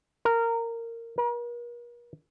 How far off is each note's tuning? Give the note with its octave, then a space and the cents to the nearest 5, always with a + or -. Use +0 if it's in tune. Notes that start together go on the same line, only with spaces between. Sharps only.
A#4 -15
A#4 +45